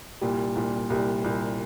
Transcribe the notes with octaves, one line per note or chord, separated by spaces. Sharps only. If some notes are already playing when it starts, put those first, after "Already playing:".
C2 A#2 G3
C2 A#2 G3
C2 A#2 G3
C2 A#2 G3